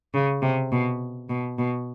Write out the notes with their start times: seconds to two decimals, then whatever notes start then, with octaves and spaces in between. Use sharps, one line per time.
0.14 C#3
0.43 C3
0.72 B2
1.29 B2
1.59 B2